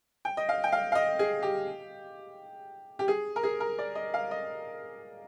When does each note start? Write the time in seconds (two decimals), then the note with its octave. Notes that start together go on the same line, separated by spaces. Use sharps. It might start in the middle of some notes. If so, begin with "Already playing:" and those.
0.25 G5
0.37 D#5
0.49 F5
0.64 G5
0.72 F5
0.92 F5
0.95 D#5
1.19 G#4
1.43 G4
2.99 G4
3.08 G#4
3.36 A#4
3.43 G#4
3.60 A#4
3.79 D5
3.95 D#5
4.14 F5
4.31 D#5